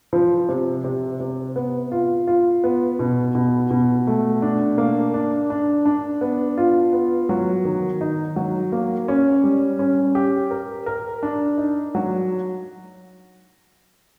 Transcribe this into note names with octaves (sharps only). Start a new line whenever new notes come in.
F3
C3
C3
C3
B3
F4
F4
B3
B2
B2
B2
A3
D4
A#3
D4
D4
D4
B3
F4
B3
F#3
D#3
D#4
F#3
A#3
C#4
G3
C#4
G4
A#4
A#4
D4
D#4
F#3